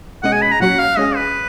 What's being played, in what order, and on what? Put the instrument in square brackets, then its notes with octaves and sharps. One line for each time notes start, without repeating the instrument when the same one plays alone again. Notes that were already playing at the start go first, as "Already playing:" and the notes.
[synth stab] B2 G#3 C#4 G#4 D#5 [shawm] F#5
[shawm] G#5
B5
A#5
[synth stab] A#2 F#3 C#4 F#4 [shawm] F#5
[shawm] F5
[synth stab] G#3 C#4 G#4 [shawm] D#5
[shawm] B4